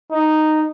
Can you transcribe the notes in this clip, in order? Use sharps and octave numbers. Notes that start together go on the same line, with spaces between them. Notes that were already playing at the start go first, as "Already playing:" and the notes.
D#4